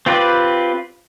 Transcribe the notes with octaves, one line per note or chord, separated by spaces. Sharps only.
C4 F4 G4 B4 D5